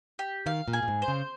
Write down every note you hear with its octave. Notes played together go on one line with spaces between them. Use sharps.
G4
D#3 F5
A#2
G#4
A#2
G#2
C5
C#3